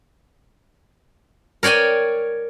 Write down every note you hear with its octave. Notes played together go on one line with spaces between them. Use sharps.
A#4 C#5 D5 G5 G#5